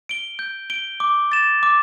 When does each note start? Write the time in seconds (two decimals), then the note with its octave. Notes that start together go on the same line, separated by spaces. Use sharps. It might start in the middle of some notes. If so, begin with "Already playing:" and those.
0.09 D7 G7
0.39 G6
0.70 D7 G7
1.00 D6
1.32 A6 E7
1.63 D6